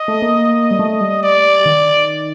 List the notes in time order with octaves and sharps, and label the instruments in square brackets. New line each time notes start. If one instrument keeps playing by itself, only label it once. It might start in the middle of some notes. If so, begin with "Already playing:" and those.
Already playing: [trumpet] D#5
[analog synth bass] A3
A#3
G3
A3
G3
[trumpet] D5
[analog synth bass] D#3